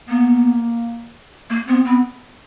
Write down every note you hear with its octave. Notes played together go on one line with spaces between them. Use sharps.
A#3 B3
A#3
B3 C4
B3 C4